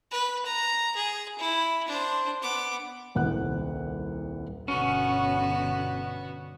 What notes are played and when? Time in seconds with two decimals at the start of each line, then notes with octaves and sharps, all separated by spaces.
0.11 B4
0.45 A#5
0.96 G#4
1.38 E4
1.87 D4 C5
2.42 B3 D6
3.15 D#1 C2 F#5 F#6
4.68 G1 B2 D3 B3 C#4 F#4